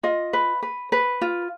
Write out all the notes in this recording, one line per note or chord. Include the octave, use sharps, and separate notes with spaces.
F4 D#5
B4
B4
B4
F4